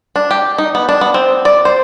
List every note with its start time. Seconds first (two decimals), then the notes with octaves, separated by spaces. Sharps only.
0.16 D4
0.31 G4
0.58 D#4
0.75 B3
0.89 D4
1.01 B3
1.14 C4
1.45 D5
1.65 C5